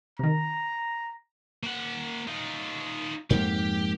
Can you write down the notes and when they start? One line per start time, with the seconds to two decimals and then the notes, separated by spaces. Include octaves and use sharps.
0.19 C3 D#3 A#5
1.63 A#3 F#5
2.27 D#4 F4
3.30 F2 G#2 A#3 G4